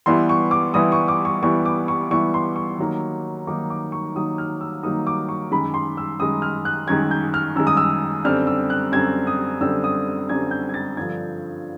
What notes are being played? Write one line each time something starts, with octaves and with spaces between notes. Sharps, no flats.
E3 G3 B3 E4 C6
C#6
D6
E3 G3 B3 E4 D#6
C#6
D6
C#6
E3 G3 B3 E4 C#6
D6
C#6
E3 G3 B3 E4 C#6
C6
C#6
D#3 F#3 A#3 D#4
D#3 F#3 A#3 D#4 D6
D6
C#6
D#3 F#3 A#3 D#4 D#6
F6
E6
D#3 F#3 A#3 D#4 D#6
D6
C#6
F#2 D#3 G#3 B5
C6
E6
F#2 D#3 G#3 D#6
F6
F#6
F#2 D#3 G#3 G#6
G6
F6
F#2 D#3 G#3 E6
D#6
E6
F#2 D3 G3 C4 F6
E6
F#6
F#2 D3 G3 C4 G#6
D#6
F#2 D3 G3 C4 E6
D#6
F#2 D3 G3 C4 G#6
G6
G#6
A6
G2 D3 F3 G#6